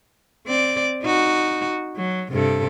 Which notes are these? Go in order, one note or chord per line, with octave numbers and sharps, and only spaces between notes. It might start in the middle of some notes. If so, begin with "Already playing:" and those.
C4 D5
D#4 F#4
F#3
G2 C3 A4